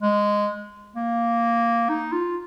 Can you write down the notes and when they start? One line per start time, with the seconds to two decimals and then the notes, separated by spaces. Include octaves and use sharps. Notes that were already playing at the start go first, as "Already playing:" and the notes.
0.02 G#3
0.96 A#3
1.89 D#4
2.13 F4